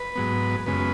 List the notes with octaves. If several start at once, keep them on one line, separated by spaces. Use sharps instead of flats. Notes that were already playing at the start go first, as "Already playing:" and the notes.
Already playing: B4
G#2 F#3 B3
F#2 C#3 G#3 B3 B4